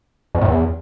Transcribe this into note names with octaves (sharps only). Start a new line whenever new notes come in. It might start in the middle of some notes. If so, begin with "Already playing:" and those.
F2
A2
E2